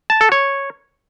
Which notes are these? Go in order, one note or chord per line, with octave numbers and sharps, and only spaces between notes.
A5
A4
C#5